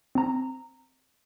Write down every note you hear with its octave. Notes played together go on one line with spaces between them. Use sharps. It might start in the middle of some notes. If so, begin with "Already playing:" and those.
C4 A#5